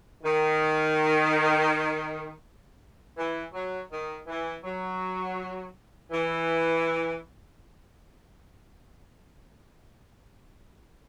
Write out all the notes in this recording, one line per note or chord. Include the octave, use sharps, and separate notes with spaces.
D#3
E3
F#3
D#3
E3
F#3
E3